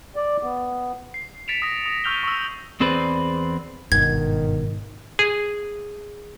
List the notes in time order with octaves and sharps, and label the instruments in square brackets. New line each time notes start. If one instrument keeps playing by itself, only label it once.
[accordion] D5
B3
[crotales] C7
A6 B6 C#7 D7 E7 F7
D#6 A#6
D#6
C#6 E6 F6 G6 F7 G7
C#6 E6
[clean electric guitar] E2 C4 G#4 B4 C5 D5
[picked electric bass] G1 B2 [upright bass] G#2 [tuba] D#3 [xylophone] G#6
[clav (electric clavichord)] G#4